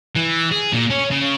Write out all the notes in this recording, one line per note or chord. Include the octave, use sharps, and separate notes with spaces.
E3
G#4
A#2
C#4
C#3